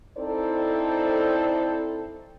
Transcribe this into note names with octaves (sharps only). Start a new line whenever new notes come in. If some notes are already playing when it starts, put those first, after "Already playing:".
C4 D#4 E4 A4 C5 D5